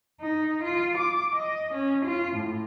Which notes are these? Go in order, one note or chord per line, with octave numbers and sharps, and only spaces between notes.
D#4
F4
D6
D#5
C#4
F4
A2